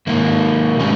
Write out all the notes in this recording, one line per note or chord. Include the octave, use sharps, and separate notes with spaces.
G#2 D#3 A#3
B2 G#3 C#4